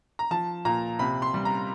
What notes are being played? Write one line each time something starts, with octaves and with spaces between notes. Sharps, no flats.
A#5
F3 A5
A#2 A#5
C3 B5
C6
G3
A#5